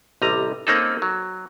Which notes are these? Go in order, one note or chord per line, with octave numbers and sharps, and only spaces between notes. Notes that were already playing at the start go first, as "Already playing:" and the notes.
A1 C3 G3 D#5 A#5
A#3 C4 C#4 D#4 G#4 A4
F#3